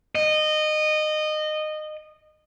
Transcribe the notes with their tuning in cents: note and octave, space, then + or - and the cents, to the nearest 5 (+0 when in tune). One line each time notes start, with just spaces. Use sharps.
D#5 -20